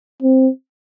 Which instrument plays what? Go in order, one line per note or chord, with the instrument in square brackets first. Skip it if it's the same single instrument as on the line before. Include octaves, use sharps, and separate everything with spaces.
[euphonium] C4